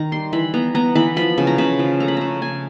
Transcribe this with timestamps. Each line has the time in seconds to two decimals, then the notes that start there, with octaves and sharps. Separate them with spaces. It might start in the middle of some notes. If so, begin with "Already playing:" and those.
Already playing: D#3 A#5
0.12 G3 C6
0.33 E3 B5
0.54 B3 A#5
0.75 B3 A#5
0.95 E3 B5
1.16 F3 B5
1.38 C#3
1.47 A#5
1.58 C#3 B5
1.79 F3
2.00 A3 A#5
2.08 B5
2.17 C#3 A#5
2.42 C#3 G#5